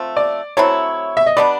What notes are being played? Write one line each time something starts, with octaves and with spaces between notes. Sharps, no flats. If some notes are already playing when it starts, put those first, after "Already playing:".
Already playing: F3 A3 C4
D5
F#3 A3 C4 E4 C#5
E5
D#5
G3 B3 D4 D5